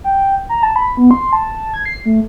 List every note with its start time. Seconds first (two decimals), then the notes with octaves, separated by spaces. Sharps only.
0.04 G5
0.49 A#5
0.63 A5
0.76 B5
0.97 B3
1.11 C6
1.33 A5
1.74 G#6
1.85 C7
2.05 A3